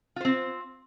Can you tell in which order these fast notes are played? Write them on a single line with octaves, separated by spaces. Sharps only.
F4 C5 C4